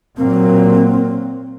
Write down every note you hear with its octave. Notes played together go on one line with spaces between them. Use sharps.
A#2 F#3 A#3 C4